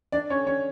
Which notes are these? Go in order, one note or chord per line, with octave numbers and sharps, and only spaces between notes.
D4 D5
C#4 C#5
C#4 C#5